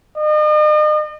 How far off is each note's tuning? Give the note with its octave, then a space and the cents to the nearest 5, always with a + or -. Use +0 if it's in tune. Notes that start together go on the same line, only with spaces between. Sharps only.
D#5 -40